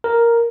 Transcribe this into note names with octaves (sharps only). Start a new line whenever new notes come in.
A#4